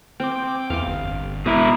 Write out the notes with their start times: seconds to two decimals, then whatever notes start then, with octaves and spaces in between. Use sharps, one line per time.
0.20 C4 G5 D6
0.70 E2 F5 D6
0.87 G1
1.46 B2 E4 A#5